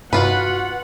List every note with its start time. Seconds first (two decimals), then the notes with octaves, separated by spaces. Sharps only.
0.13 G2 C3 F4 F#4 B4 F#5